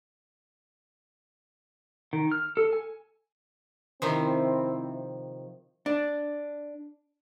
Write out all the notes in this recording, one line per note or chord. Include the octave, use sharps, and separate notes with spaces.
D#3
F6
A4
G#5
C3 D#3 F3 C4 E4
D4